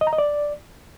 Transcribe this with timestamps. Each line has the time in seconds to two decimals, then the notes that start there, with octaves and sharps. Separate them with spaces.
0.01 D#5
0.07 A#5
0.13 D#5
0.18 D5